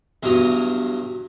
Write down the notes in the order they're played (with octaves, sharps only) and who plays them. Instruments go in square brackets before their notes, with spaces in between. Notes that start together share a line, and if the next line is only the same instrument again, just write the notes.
[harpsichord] E2 G2 F#3 D#6